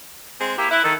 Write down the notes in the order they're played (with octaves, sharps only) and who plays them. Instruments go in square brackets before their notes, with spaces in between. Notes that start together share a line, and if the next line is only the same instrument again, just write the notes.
[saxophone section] G#3 C4
[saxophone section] A#3 G4 [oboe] E4
[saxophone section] E4 [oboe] B4
[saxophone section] D#3 [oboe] A4